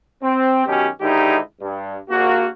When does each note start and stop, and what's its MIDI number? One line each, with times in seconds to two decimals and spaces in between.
0.23 0.65 60
0.66 0.88 47
0.66 0.88 51
0.66 0.88 54
0.66 0.88 61
0.66 0.88 67
1.01 1.37 44
1.01 1.37 50
1.01 1.37 51
1.01 1.37 63
1.01 1.37 64
1.01 1.37 67
1.61 1.97 43
2.10 2.46 34
2.10 2.46 58
2.10 2.46 66